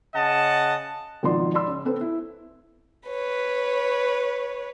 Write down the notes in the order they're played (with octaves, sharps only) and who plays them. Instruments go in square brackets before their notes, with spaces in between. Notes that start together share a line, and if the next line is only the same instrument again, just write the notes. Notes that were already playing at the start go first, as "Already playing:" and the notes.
[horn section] C#3 D#5 F#5 A5
[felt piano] G#1 B2 F3 D#4 D5 C6
D5 B5 C6 E6
C#3
B3 C4 A4 B4 C5
E4
[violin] B4 C#5